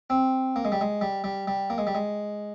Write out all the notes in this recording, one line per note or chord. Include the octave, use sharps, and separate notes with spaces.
C4
A#3
G#3
G3
G#3
G3
G3
G3
A#3
G#3
G3
G#3